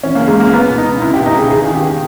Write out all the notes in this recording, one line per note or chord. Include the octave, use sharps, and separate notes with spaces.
E3 C#4
C#3 A#3
G#3
C#2 A#3
C#2 B3
B2
D#4
C#2
C#2 E4
G4
B2
D#4
C#2 G#4
E2 G#4
D#3
G4